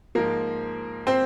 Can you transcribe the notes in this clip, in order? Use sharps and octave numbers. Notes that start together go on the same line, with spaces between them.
G#2 F3 A#3 A#4
C4 C5